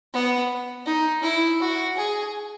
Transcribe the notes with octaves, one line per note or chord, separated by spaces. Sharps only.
B3
D#4
E4
F#4
G#4